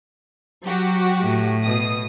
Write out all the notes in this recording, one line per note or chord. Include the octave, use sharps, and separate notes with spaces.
F#3 F#4 G4
A2
B2 D#6